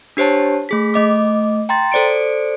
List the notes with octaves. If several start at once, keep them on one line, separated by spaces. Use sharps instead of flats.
D4 G4 C5 C#5 A5
A3 G#4 B6
A3 D#5 D6
G5 A#5 C6 A6
A4 C5 D5 C#7 D7